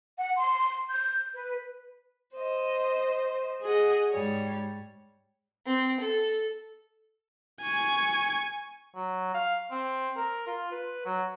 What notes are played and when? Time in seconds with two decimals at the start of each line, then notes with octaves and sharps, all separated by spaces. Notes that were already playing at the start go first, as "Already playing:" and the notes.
0.18 F#5
0.36 C6
0.89 G6
1.35 B4
2.34 C5 D#5
3.62 G#4 D#5 F#5
4.10 G#2 G3 C#5
5.66 C4
6.00 A4
7.62 G#5 C#6
8.95 F#3
9.34 F5
9.71 C4
10.17 A#4
10.47 F4
10.71 B4
11.05 F#3